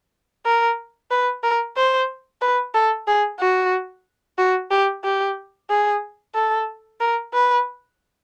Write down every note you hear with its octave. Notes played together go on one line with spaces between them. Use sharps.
A#4
B4
A#4
C5
B4
A4
G#4
F#4
F#4
G4
G4
G#4
A4
A#4
B4